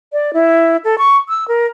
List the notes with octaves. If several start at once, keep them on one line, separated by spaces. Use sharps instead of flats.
D5
E4
A4
C#6
E6
A#4